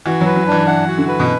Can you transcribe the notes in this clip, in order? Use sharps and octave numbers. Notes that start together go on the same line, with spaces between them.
E3 F#4
F#3 B4
F#3
E3 D4
E3 F#5
F#4
D3
B4
B2